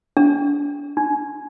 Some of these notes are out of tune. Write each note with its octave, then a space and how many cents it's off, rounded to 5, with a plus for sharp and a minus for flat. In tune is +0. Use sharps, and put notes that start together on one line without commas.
D4 -30
D4 +40